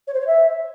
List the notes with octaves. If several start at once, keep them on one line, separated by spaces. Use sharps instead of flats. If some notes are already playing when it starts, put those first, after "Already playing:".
C#5
C5
C#5
E5